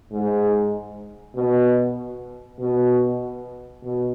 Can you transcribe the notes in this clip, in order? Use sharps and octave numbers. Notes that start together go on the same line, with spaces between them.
G#2
B2
B2
B2